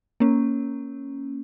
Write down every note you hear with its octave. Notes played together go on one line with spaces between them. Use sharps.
A#3 C#4